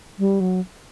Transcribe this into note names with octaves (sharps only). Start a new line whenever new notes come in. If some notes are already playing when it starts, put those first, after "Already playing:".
G3
F#3